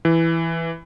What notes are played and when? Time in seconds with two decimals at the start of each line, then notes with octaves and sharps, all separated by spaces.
0.05 E3